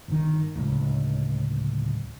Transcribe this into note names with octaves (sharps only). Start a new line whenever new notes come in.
G1 D#3
D1 C#2